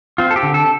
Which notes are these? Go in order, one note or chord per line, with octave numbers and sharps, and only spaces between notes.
C4 F4
A4
G4
D3
A4